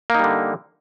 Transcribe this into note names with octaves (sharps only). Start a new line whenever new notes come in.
D3 G3 A#3 D#4